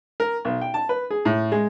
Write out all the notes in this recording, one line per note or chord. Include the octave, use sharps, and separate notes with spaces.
A#4
B1
G5
A5
B4
G#4
A2
G#3